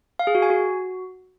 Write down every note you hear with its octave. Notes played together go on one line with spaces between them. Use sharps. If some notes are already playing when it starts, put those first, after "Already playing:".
F5
G#4
F#4
G#5
F#4